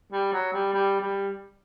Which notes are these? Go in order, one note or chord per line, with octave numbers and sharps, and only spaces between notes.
G3
F#3
G3
G3
G3